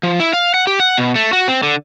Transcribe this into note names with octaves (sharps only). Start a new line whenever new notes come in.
F3
E4
F5
F#5
G4
F#5
B2
A3
F#4
C4
D3